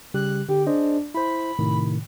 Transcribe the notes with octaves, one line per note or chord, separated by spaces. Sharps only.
C#3 G3 G4 F#6
D3 G4
D4 G#4 C5 D#5
E4 C5 B5
A2 C3 D#3